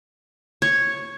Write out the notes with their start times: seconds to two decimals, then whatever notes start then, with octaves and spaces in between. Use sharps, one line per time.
0.62 C#5